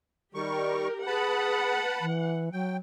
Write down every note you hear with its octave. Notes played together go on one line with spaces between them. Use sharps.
D#3 G3 G4 A#4 C#6
G#4 B4 F#5 A5 B5
E3
F#3 G5